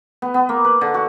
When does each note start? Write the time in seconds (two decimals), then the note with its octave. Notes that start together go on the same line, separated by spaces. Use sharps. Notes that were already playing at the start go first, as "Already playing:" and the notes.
0.22 B3
0.34 B3
0.49 A#3
0.64 B4
0.81 D3
0.94 F#4